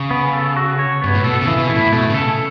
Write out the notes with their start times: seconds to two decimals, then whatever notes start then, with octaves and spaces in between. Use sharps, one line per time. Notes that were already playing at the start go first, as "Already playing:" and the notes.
Already playing: C#3
0.11 B3
0.33 A4
0.57 F#4
0.79 C#5
1.02 G2 B3
1.14 A2
1.24 B2 A4
1.41 C#3
1.47 E3
1.58 B2
1.70 E4
1.76 A2
1.93 B2 A3
2.10 C#3 A4